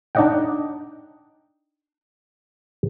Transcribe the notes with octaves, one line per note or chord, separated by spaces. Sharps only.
D4 D#4 D5 D#5 F#5 G5